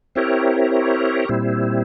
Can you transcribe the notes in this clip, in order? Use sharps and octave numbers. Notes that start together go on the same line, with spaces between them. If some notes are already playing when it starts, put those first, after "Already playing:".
C4 E4 G4 A#4 C#5
A#2 G3 C4 E4